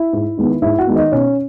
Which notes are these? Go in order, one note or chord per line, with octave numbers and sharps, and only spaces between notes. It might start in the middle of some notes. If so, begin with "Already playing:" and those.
Already playing: E4 E5
G#2
D#3 G#3 B3
G#2 E4 E5
F#4 F#5
D#3 G#3 B3
D#4 D#5
B2 C#4 C#5